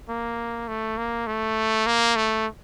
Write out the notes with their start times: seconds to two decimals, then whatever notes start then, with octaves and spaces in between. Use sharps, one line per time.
0.09 A#3
0.68 A3
0.97 A#3
1.27 A3
1.86 A#3
2.16 A3